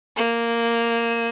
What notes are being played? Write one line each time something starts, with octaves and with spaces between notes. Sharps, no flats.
A#3